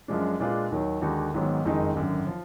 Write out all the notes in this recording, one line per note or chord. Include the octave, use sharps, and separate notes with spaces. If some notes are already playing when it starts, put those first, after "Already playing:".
F#2 F3 G#3 D4
A#2 G#3 D4 F4 B4
D#2 D#3 F#3
D#2 D3 G#3 D#4 F#4
G#1 G#2 F#3 B3
F#1 F2 D#3 G#3 D#4
G#1 F#2 D3
F3